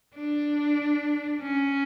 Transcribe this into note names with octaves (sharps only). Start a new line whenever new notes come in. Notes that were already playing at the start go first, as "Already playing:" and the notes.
D4
C#4